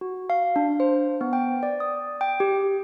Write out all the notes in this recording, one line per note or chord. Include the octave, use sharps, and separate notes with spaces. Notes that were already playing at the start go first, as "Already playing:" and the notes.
F#4
F5
D4
C5
B3
G5
D5
D#6
G5
G4